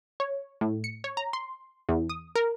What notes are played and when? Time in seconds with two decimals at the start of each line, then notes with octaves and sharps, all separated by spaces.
0.20 C#5
0.61 A2
0.84 C#7
1.04 C#5
1.17 A#5
1.33 C6
1.89 E2
2.10 D#6
2.36 A#4